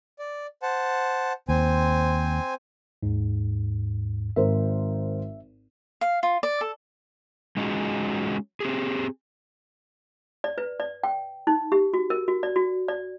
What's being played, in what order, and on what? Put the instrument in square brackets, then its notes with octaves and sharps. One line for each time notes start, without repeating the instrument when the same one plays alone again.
[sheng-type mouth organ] D5
C5 F#5 A5
[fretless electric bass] D#2 [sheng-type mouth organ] C4 C5 G#5
[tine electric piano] D#2 G#2
[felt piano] G#1 A#4 C5 [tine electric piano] E5
[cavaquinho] F5
F4
D5
A4
[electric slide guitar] G#3 C#4 D#4 F4 F#4 G#4
C4 G4 G#4
[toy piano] D5
B4
D5
G5
D#4
G4
F#4
A#4
F#4
D5
F#4
D5